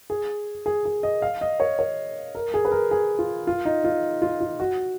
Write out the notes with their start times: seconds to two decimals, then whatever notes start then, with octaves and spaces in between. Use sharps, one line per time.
0.10 G#4
0.66 G#4
0.85 G#4
1.03 D#5
1.22 F5
1.41 D#5
1.60 C#5
1.79 C#5
2.35 A#4
2.54 G#4
2.65 B4
2.72 A#4
2.91 G#4
3.19 F4
3.47 F4
3.65 D#4
3.84 F4
4.22 F4
4.41 F4
4.60 F#4